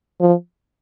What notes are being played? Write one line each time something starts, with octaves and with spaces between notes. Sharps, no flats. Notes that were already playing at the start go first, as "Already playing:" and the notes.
F3